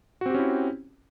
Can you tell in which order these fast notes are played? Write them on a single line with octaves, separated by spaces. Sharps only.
F#4 C4 G4 C#4 E4